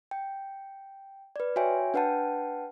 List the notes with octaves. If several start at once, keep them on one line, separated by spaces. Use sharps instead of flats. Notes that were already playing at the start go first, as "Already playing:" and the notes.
G5
B4 D5
F#4 C#5 E5 G5 G#5
D4 B4 F#5 G5 A5